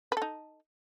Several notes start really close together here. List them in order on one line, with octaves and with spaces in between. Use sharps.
B4 A4 D#4